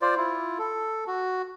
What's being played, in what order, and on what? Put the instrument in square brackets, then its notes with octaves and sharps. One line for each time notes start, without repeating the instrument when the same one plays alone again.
[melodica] F4 C5 D5
E4 F4
A4
F#4